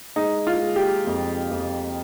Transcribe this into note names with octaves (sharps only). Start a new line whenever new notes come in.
G#3 D#4
F4
G#3
G4
F2
F2